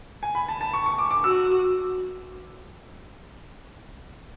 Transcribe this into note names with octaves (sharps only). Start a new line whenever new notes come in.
G#5
B5
A5
A5
C#6
C#6
D6
D6
F#4 E6